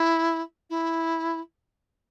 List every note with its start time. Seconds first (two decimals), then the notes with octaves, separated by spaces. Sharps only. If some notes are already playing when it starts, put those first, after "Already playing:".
Already playing: E4
0.70 E4